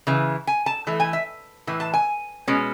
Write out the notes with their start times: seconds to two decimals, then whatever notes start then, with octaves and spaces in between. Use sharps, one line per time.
0.07 C#3 E3
0.47 G#5
0.66 A5
0.87 E3 A3
1.00 G#5
1.13 E5
1.67 A2 E3
1.80 A5
1.94 G#5
2.48 B2 G#3 C#4